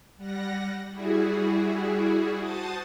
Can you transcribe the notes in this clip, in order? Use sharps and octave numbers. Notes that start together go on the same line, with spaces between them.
G3 F#5 A#6
G3 E4 F#4 G#4
F#4 C5 A5 D#6 A6